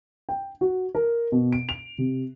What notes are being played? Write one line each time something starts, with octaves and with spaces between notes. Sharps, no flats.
G5
F#4
A#4
B2
D7
F7
C3